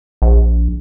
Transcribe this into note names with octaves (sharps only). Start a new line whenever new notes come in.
A#1